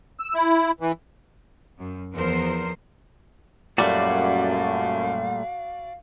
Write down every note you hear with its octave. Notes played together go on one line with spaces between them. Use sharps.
E6
E4
E3
F#2
E2 F3 B3 A#4 C5
F#2 A#2 G3 A3 F#4 D5 F5